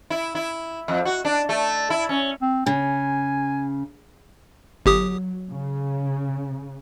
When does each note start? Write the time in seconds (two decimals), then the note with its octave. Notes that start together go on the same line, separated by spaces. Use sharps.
0.10 E4
0.35 E4
0.88 F2
1.05 F#4
1.25 D4
1.49 A3
1.90 E4
2.09 C#4
2.42 C4
2.66 C#3 G#5
4.86 G1 F#3 G4 D#6
5.51 C#3